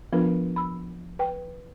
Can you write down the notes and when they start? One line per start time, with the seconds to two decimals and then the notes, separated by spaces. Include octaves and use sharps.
0.13 F3 B3 D4 F4 A#4 B4
0.56 B5 E6
1.19 B4 G5